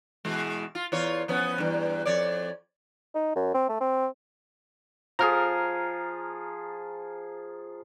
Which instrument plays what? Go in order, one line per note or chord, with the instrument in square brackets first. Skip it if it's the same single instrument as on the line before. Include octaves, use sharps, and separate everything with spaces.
[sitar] B2 E3 G#3
F4
E2 F4 C#5
F3 B3 C#4
E2 G2
F2 C#5 D5
[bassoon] D#4
F#2
C4
A3
C4
[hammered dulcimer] F3 G#4 [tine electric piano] A#5 F6